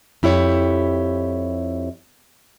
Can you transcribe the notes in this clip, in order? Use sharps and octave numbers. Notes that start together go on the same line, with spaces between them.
F2 E4 G4 C#5